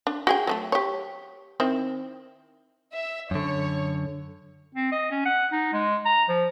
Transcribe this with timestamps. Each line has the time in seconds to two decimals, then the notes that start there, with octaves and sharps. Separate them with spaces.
0.07 D4
0.27 F#4 G#4 G5
0.47 F#3 G3 A3
0.72 G4 C#5
1.60 D#3 C4 E4
2.93 E5
3.31 F#2 D3 C#5
4.75 C4
4.92 D#5
5.11 C#4
5.25 F#5
5.52 D#4
5.73 G#3
6.06 A#5
6.29 F3